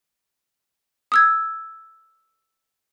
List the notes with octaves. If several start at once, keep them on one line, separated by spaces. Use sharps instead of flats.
D#6 E6 G#6